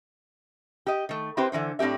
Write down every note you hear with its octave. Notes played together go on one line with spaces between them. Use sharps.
G4 D#5
D#3 A3
C4 E4 G4 B4 C5
D3 E3 E4 C5
A2 C4 D4 G4 E5